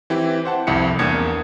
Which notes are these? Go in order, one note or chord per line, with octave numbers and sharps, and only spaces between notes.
E3 C4 E4 G4
C5 F#5 A5
C2 F2 E4 C#7
E2 A#3 D4 D#6 G#6 C#7